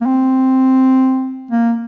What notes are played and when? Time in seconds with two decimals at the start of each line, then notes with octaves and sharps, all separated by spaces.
0.01 A#3
0.06 C4
1.51 A#3